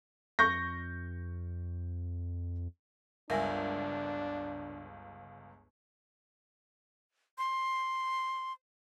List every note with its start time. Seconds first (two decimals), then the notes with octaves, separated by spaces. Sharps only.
0.39 F2 C#6 G6 A#6
3.30 G1 C#2 D4 A#4 E5 G#5
7.38 C6